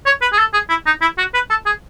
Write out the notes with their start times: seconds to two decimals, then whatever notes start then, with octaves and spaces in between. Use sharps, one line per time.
0.06 C#5
0.22 B4
0.33 G#4
0.39 A4
0.53 G#4
0.69 E4
0.86 D#4
1.01 E4
1.18 F#4
1.34 B4
1.50 A4
1.66 G#4